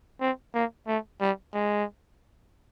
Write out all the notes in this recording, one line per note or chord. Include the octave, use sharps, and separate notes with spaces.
C4
A#3
A3
G3
G#3